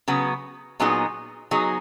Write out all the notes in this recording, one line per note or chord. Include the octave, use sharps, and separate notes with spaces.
C#3 F#3 B3
A#2 F#3 B3 D#4 G#4
F#3 B3 D#4 G#4